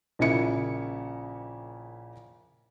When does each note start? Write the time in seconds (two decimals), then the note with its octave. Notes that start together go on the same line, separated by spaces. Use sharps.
0.19 A#1 C#3 A#3 E4 C#7